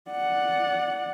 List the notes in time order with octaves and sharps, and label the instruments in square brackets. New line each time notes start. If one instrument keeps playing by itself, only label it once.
[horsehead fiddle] D5 F#5